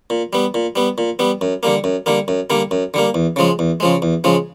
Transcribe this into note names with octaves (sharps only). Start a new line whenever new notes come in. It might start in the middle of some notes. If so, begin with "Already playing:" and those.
A#2
G3 B3
A#2
G3 B3
A#2
G3 B3
F#2
D3 G3 A#3
F#2
D3 G3 A#3
F#2
D3 G3 A#3
F#2
D3 G3 A#3
E2
C#3 F3 G#3
E2
C#3 F3 G#3
E2
C#3 F3 G#3